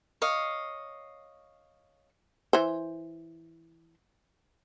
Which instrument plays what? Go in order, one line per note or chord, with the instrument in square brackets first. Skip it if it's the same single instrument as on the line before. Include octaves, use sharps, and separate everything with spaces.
[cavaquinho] C#5 D#5 F5
[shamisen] E3 C5